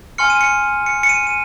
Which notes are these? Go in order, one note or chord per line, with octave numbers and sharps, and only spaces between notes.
G#5 C6 F6 C#7
D#7
C#7
C#7
C#7
D#7
D#7